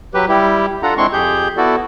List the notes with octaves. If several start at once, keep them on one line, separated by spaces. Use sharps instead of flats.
F#3 G4 B4
G3 E4 G4
D4 F4 A4 F#5 A#5
G#3 C4 D4 E4 C6 C#6
F2 G4 G#4 G6
B3 E4 F#4 A4 D5